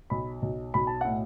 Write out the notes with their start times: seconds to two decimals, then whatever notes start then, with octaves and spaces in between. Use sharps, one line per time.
0.10 B1 B5
0.42 B1
0.74 B1 B5
0.87 A5
1.01 A2 F#5